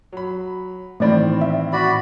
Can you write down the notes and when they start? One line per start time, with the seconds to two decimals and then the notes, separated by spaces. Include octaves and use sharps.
0.12 F#3 B5
1.00 A2 D#3 E3 A3 C4 D5 B5
1.41 E5
1.73 F#4 D5 B5